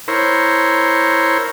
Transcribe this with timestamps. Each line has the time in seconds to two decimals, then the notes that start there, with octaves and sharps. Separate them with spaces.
0.08 E4 A#4 C5 C#5